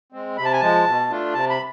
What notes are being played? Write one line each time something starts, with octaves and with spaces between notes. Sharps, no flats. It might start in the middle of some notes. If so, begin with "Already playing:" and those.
G#3 C4
C3 B5
A5
G#5
F3 G#3 A5
B2
A3 D4 F4
C3 A5
B5